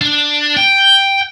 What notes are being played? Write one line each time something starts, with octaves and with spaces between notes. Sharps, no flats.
D4
G5